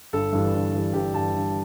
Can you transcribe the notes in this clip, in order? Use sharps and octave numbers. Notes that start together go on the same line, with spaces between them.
G1 A4
G2 E3 G3
G1
G2 E3 G3
G1 G4
G2 E3 G3 A5
G1